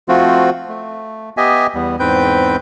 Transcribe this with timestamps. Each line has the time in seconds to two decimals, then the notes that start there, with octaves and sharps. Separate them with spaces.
0.08 F3 A3 C4 F4 F#4
0.69 A3
1.37 B3 G4 D#5 E5 G#5
1.75 E2 G3 B3
2.00 E2 G#2 C4 B4 G5 G6